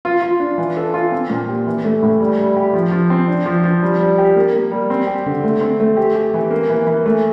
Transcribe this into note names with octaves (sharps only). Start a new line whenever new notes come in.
F4
F4
D4
E3
A4
F4
C4
A#2
G4
E3
A3
A2
G3
G3
G4
F3
F3
C4
D4
F3
F3
G3
G3
G4
A#3
A#3
G3
C4
G4
D3
A3
C4
A3
G4
G4
E3
A#3
E3
E3
A3